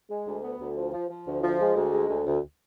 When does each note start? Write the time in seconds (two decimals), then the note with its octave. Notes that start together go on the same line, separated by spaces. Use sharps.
0.09 G#3
0.27 D2
0.43 B3
0.60 D2
0.77 F3
0.93 F3
1.09 F3
1.26 D2
1.43 F3
1.60 G#3
1.76 D2
1.92 G#3
2.09 D2
2.26 D2